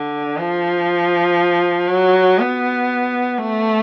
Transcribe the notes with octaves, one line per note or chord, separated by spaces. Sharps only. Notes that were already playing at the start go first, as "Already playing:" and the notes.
Already playing: D3
F3
F#3
B3
A3